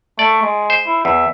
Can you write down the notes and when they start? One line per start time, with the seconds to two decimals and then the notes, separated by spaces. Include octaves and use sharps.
0.19 A3 D5
0.43 G#3
0.70 C5
0.87 E4
1.05 E2 E5